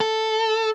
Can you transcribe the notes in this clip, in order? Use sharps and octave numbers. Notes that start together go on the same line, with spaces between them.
A4